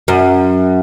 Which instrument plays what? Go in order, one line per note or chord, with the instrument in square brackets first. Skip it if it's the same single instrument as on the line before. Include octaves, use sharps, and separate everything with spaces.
[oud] F#2